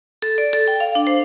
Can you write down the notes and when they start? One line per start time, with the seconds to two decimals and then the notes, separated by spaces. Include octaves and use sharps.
0.22 A4
0.38 D5
0.53 A4
0.68 G5
0.80 F5
0.95 D4
1.07 C5